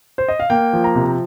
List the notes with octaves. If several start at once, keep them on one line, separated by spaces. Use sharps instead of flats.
C5
D#5
F5
A#3 G5
F3
A#5
C3